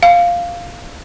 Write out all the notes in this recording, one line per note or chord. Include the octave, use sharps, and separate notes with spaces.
F5